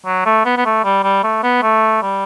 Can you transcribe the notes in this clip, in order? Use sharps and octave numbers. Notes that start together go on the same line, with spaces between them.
F#3
A3
B3
B3
A3
G3
G3
A3
B3
A3
G3